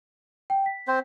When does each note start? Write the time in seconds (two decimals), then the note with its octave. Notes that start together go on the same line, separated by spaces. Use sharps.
0.50 G5
0.66 B6
0.88 C4 C5